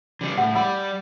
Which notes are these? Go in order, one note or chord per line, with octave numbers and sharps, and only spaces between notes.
D3 G3
A2 F#5
G3 F#5 B5 E6